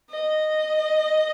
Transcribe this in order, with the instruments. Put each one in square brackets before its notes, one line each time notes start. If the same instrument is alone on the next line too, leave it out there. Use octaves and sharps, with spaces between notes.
[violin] D#5